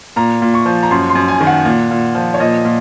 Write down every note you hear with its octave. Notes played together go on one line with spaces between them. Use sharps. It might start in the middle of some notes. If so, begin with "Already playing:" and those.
A#2 A#5
A#2
C#6
F3
A#5
F#2 C6
C6
F#2
G#5
D#3
F#5
A#2
A#2
F3
C#5
A#2 D#5
A#2